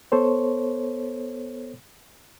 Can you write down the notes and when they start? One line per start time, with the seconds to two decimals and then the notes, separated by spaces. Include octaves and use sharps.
0.12 B3 A4 C5 C#5